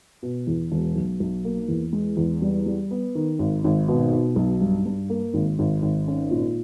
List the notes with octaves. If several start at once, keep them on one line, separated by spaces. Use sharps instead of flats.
B2
E2
E1
B1
B1
A#3
E2
G#3
E2
G3
G3
B3
D#3
G#1
G#1
B2
B2
B1
G2
G2
A#3
G#1
G#1
G#1
C#4
A#2